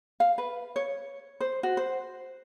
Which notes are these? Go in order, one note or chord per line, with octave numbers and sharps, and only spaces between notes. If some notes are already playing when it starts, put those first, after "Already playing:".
F5
B4
C#5
C5
F#4
C5